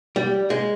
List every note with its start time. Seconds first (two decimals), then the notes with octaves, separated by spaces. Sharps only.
0.16 G3
0.50 G#3